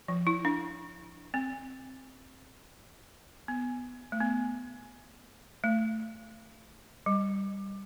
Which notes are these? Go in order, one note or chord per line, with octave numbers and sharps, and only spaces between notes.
F3
E4
D4
C4
B3
A3
B3
A3
G3